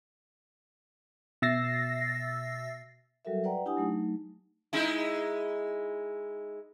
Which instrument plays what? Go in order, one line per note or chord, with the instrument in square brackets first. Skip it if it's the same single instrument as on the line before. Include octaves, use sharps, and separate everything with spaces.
[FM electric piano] B2 E5 E6 A6 A#6 C7
[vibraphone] F#3 G3 F#4 A4 A#4 E5
B4 D5 F#5 G5 A#5
D4 E4 G4 F#5 G#5 D#6
F#3 A3 D#4
[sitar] G#3 D#4 E4